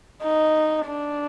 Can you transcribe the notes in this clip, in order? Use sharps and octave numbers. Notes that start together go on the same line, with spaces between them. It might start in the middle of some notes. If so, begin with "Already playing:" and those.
D#4
D4